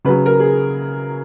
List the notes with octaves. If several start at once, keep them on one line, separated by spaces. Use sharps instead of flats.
C#3 F#3 B4
A#4
G#4